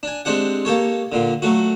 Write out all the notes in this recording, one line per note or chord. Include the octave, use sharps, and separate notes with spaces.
D4 G#5
G#3 C4 D4 G4 F#5
A#3 G4 A4 C#5
A#2 D3
F#3 A3 F#4